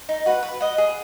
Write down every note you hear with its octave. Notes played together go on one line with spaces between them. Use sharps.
D#4
F#4 B4 F#5
B4
D#5 F#5
G#4